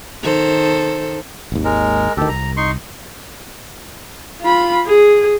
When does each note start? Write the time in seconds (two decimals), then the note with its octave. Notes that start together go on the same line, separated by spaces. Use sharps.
0.23 D#3 A4 C5
1.52 G#1 D#2
1.65 G#3 A#4
2.17 D2 D#3 G4 A4
2.29 C2 A#5
2.57 D#4 C6 C#6
4.41 F4 B5
4.86 G#4